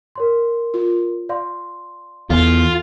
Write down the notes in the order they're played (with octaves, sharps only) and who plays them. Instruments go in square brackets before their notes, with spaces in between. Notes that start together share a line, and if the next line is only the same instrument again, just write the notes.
[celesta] A#4 C#5 C6
[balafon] F4
[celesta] D5 F5 C6
[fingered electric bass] E2 [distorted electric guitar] F4 [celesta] A4 C#5 G#5